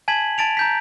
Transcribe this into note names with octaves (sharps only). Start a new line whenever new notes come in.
G#5 A5 G#6 B6 F#7
A5 A6 D7 F7
A#5 G6 B6